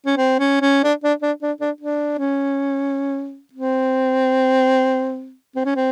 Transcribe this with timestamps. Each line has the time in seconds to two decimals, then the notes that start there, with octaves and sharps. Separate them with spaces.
0.06 C#4
0.17 C4
0.39 C#4
0.61 C#4
0.84 D4
1.04 D4
1.22 D4
1.42 D4
1.61 D4
1.81 D4
2.18 C#4
3.53 C4
5.56 C4
5.65 C#4
5.76 C4